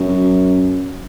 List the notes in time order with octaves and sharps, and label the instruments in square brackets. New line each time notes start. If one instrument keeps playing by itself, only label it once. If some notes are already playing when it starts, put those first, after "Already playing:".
Already playing: [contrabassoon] F#2